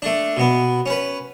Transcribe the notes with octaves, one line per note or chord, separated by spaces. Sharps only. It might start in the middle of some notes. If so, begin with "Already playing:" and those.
A3 D4
B2 B3
C#4 B4